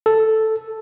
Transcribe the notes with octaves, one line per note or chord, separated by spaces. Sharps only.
A4